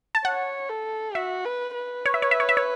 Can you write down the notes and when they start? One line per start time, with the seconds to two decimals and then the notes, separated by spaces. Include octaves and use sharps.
0.15 A5
0.25 C#5 F#5
0.70 A4
1.15 F#4 E5
1.45 B4
1.75 B4
2.06 C#5
2.14 E5
2.22 C#5
2.31 E5
2.40 C#5
2.49 E5
2.57 C#5